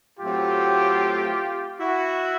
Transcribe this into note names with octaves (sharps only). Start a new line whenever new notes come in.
A2 F#3 A3 C4 F4 G4
E4 F#4